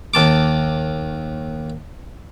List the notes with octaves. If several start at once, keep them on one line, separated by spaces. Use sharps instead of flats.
D#2 A5 D6